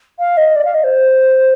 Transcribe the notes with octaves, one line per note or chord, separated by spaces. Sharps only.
F5
D#5
D5
F5
D#5
C5